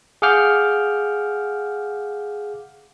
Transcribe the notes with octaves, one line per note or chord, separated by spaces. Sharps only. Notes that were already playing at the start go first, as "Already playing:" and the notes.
G#4 F5 F#5 D6 F6 G6